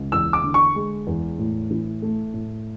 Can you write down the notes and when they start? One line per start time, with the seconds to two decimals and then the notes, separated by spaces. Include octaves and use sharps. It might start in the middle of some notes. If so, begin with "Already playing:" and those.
Already playing: C#2
0.12 E2 E6
0.33 D6
0.44 D3
0.54 C#6
0.75 G#3
1.07 E2
1.39 A2
1.71 E3
2.02 A3
2.34 A2